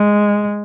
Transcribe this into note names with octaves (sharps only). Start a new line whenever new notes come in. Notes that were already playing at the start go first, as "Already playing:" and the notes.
Already playing: G#3